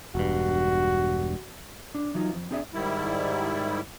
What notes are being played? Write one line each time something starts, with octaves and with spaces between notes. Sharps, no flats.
E1 G2 F#4
D4
E3 F#3 D#4 F4
F2
C4 D4 G#4 D5 E5
G#2 D#3 G3 E4